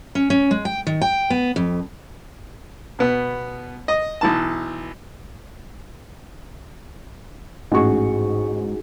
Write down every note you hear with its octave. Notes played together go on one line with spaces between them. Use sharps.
C#4
C#4
G#3
G5
D#3
G5
B3
F2
B2 B3
D#5
B1 E3 A5
A1 G#2 D#4 F#4 G#4 C#6